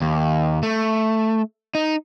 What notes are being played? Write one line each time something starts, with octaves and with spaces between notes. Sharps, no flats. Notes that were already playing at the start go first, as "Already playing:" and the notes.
D#2
A3
D#4